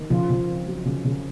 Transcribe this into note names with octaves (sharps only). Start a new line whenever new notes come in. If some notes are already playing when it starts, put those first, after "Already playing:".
Already playing: D#3
C#3 F3 F4
C#3
C4
F#3
C#3
C#3